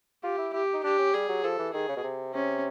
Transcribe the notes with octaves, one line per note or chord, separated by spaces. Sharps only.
F4 G4
E4
E4 G4
D#4
D4 G4
C#4
G3 G#4
F#3
F3 A4
E3
D#3 G#4
C#3
B2
C3
C3 C#4